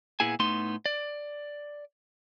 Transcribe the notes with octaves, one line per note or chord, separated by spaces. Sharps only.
A#2 B3 E4 G#4 G#5
A2 A3 B3 D#4 C6
D5